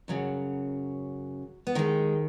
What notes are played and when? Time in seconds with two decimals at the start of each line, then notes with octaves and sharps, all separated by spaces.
0.08 F#2 C#3 F#3
1.67 B3
1.75 D#2 D#3 G#3